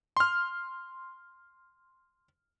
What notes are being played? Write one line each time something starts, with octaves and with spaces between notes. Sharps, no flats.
C6 F6